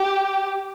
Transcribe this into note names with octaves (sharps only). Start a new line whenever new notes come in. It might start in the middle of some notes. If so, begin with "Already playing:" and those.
Already playing: G4